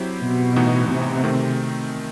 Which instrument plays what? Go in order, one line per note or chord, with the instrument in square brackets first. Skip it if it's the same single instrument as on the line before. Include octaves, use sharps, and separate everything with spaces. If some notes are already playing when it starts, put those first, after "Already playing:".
Already playing: [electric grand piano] F#3 C4 E4 G4 C5
[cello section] B2
[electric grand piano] A2 E3 B3 D#4 F#4
[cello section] C3
[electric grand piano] D#3 A3 C4